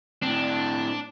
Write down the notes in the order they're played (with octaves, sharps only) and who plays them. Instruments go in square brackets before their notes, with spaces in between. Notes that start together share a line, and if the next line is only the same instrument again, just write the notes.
[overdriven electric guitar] A2 C4 [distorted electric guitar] D4